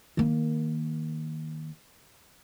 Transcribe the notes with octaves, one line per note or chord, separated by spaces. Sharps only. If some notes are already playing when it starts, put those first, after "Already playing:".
D#3 A#3